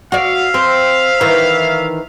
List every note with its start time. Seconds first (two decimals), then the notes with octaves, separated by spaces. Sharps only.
0.12 F#4 D5 E5 F5
0.54 C4
1.21 D#3 E3